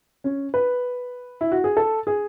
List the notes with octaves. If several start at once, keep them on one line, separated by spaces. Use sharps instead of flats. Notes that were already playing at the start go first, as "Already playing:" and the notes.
C#4
B4
E4
F#4
G#4
A4
G#4